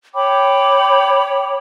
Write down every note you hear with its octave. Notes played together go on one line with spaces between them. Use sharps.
C#5 G5 B5 D6